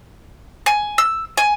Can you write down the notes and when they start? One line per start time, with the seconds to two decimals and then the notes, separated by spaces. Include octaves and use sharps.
0.66 G#5
0.98 E6
1.38 G#5